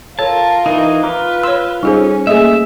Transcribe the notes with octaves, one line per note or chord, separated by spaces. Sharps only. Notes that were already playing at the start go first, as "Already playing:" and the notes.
F4 A4 A#4 C#5 A5
E3 D#4
F4 B4 A#5 D6
C#5 C6 E6
G3 C#4 D#4 G#4 A4 C5
A3 A#3 G#4 A4 D#5 E5